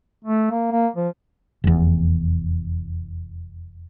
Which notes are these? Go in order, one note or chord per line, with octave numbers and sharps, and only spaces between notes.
A3
A#3
A#3
F3
F1 E2